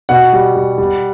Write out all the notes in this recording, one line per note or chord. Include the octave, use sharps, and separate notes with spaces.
B2 F#5
G3
G3
G3